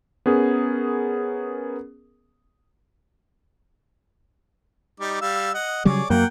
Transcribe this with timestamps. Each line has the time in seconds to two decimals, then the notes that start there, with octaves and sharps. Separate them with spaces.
0.26 B3 C#4 G#4 A#4
5.00 G3 D#4 D6
5.21 G3 F5 E6
5.54 D#5 F#5
5.85 C#3 F#3 G3 G#4 C#5 D5
6.10 F#2 F#3 A#3 F#5 G5